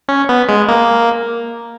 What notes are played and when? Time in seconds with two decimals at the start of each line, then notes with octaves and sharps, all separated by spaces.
0.08 C#4
0.29 B3
0.49 G#3
0.68 A#3